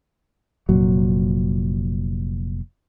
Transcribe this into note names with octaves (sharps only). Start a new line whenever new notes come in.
F1 A#2 F#3